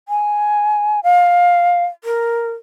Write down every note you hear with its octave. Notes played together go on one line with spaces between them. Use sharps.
G#5
F5
A#4